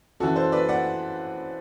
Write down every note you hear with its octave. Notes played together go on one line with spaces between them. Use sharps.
F#2 E3 F#4 A4
A4 C5
B4 D5
D5 F#5